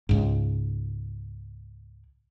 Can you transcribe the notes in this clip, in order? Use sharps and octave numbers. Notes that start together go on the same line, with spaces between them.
C#2 G#2